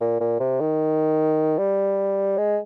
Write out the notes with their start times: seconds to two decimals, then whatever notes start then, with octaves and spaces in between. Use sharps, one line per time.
0.01 A#2
0.21 A#2
0.40 C3
0.60 D#3
1.58 G3
2.38 G#3